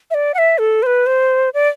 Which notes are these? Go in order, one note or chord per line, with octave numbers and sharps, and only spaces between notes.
E5
D5
F#5
E5
A4
C5
B4
C5
D5